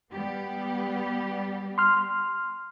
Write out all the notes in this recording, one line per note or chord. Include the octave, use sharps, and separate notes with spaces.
G3 B3 G4
C6 F6